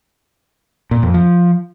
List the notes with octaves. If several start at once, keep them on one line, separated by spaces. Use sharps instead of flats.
A#2
F2
F3